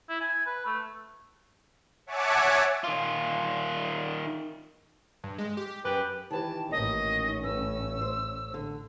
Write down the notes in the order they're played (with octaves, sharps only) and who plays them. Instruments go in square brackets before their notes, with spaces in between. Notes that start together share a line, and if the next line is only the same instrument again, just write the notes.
[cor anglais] E4
G#5
B4
A3
[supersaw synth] C#5 E5 F#5 G#5 A5 D6
[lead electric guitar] D#3 F4
[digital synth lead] G2
G#3
G4
[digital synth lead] F#2 [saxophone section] G4 B4
[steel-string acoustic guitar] D#3 E3 G4 [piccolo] A5
[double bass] A1 C#4 [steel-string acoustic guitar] D#3 A#3 D#4 [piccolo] D#5
[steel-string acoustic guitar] G2 A3 [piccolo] E6
[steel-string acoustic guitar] C5
D3